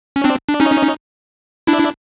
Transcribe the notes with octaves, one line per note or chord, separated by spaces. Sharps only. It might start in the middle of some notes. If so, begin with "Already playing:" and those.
C#4
C4 D4
D4
C#4 D#4
D4 E4